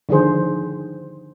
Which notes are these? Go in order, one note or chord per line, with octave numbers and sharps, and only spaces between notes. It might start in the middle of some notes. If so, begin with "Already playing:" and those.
D3 D#3 F3 G#4 C5